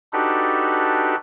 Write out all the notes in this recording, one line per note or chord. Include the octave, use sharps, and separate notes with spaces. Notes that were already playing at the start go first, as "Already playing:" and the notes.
D4 D#4 F#4 G4 A4 B4